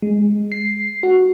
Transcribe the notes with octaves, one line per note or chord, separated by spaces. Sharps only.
G#3
C7
F#4